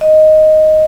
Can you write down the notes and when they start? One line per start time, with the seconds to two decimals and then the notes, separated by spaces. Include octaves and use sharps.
0.01 D#5